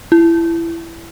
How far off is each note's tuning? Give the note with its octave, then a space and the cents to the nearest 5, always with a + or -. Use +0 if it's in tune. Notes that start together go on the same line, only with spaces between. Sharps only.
E4 +20